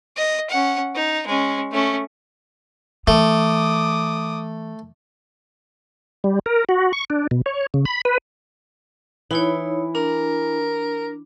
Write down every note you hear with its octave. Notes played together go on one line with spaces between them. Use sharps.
D#5
C#4 F#5
D#4
G#3 C#4
A3 C#4
E3 A3 D6 D#6
G3
A#4
F#4
C#6
D4
B2
C#5
C#3
B5
B4
E3 D#4 E4 C#5
D4 A#4